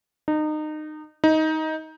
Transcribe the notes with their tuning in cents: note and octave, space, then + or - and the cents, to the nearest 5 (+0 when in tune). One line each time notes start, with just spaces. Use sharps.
D#4 -25
D#4 +15